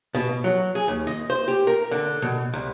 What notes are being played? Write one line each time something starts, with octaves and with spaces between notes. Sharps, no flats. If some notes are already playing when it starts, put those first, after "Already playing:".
B2
F#3
G#4
D#2
D#5
C5
G4
A#4
D3
B2
C2